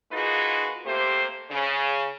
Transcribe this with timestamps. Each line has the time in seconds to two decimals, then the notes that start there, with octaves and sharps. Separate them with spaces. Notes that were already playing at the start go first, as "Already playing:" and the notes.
0.12 A#3 D#4 F4 F#4 G#4 B4
0.85 C3 A3 A#3 G4 C5
1.50 C#3